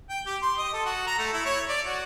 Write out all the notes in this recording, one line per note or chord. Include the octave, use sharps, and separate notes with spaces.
G5
G4
C6
D#5
A4
F#4
A#5
A3
E4
C#5
D5
F#4